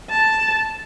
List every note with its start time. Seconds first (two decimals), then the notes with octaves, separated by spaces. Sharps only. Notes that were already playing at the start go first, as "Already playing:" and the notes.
0.10 A5